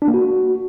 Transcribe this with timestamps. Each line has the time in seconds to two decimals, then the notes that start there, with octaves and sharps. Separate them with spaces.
0.02 D4
0.08 A#3
0.14 F#4